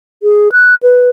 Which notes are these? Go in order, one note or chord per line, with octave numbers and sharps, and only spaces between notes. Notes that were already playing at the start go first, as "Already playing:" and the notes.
G#4
F#6
B4